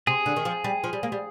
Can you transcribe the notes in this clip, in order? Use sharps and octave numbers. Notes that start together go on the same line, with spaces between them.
C3 G#4
D3
D#3
F3
G3
F3
G3
A#3
G3